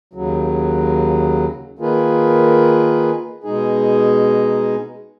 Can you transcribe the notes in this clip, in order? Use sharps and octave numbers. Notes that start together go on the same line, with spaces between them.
D#2 C#3 F#3
D#3 A#3 F4 G#4 B4
B2 G#3 D#4 G#4